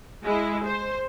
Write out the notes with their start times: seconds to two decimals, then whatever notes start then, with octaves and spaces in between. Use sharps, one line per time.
0.23 G#3 E4
0.66 C5